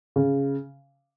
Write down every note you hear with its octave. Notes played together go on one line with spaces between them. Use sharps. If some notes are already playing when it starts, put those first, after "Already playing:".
C#3